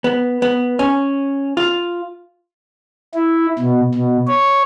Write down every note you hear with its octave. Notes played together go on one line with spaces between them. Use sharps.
B3
B3
C#4
F4
E4
B2
B2
C#5